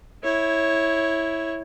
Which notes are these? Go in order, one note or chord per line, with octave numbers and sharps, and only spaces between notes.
E4 C#5